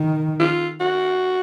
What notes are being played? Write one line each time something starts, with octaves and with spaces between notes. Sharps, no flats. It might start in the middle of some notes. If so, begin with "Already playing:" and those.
Already playing: D#3
F4
F#4